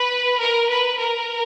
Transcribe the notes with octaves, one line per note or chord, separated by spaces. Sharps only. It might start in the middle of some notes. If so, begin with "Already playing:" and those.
Already playing: B4
A#4
B4
A#4